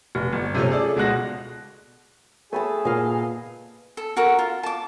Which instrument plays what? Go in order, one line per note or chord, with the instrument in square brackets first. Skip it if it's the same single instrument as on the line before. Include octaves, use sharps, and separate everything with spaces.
[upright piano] F1
G1
C3 F3 A3 C#4
G#4 A4 D5
C#2 B2 G#3 F#4 F#6 A#6
[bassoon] A3 [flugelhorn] G#4 [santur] A5 B5 D#6
[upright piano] A#2 [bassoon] B3 [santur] D#5 F5
[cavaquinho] A4
F#4 A4 A#4
F4
A5 D6